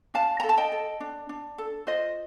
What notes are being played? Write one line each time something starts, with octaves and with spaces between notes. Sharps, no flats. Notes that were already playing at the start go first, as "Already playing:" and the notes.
D4 F5 A5
A#5
A4
A5
D#5 G5
A4
D4
D4
A4
F4 C5 D#5